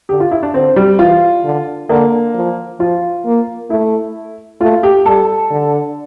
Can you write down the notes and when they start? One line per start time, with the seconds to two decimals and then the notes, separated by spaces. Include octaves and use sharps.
0.09 D3 G4
0.20 F4
0.31 E4
0.43 D4
0.54 D3 C4
0.76 G3
0.99 E3 F4
1.44 D3
1.89 D3 A#3
2.35 F3
2.80 F3 F4
3.25 A#3
3.70 A3 E4
4.60 A3 F4
4.83 G4
5.06 G3 A4
5.51 D3